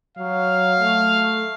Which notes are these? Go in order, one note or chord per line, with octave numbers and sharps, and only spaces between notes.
F#3 F5
A3